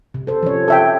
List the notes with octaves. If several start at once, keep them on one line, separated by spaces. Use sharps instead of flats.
C3
A4 C5
F3 C#4 C#5
A4 E5 G5